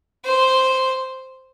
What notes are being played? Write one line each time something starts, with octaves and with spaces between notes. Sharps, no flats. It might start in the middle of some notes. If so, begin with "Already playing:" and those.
C5